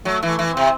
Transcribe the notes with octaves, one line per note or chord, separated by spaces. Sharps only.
F#3 A3
E3
A3
E3
C4
C3